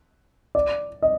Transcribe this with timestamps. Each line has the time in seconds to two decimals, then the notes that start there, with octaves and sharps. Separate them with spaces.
0.55 D5
1.02 D#5